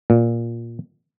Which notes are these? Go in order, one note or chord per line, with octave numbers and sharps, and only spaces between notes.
A#2